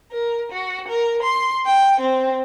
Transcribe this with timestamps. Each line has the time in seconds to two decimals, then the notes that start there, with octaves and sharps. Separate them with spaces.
0.11 A#4
0.52 F#4
0.88 A#4
1.22 C6
1.66 G5
2.00 C4